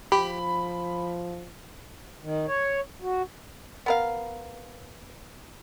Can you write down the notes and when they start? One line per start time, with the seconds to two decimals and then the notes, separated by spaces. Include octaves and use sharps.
0.12 F3 G4 B5
2.23 D#3
2.47 C#5
3.02 F#4
3.86 B3 A#4 F5